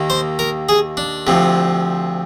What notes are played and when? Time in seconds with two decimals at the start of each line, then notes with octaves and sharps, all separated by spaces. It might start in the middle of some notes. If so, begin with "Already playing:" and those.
Already playing: D#2 D#3 A#3
0.10 C5
0.39 A#4
0.69 G#4
0.97 D4
1.27 D2 C3 F3